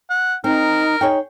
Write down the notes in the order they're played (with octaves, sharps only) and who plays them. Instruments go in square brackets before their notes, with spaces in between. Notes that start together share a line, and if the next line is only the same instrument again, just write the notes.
[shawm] F#5
[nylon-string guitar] C4 [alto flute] D#4 [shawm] A#4
[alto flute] D#4 [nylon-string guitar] G#4 C#5 G5